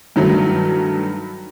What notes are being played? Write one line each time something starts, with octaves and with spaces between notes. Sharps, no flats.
G2 D#3 F#3 A3